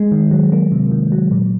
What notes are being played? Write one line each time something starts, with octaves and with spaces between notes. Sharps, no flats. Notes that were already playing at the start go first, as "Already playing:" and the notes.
Already playing: G#3
D#3
F#3
A#3
C3
D#3
F#3
A#2